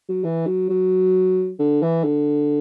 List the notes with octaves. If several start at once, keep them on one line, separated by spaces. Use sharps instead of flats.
F#3
E3
F#3
F#3
D3
E3
D3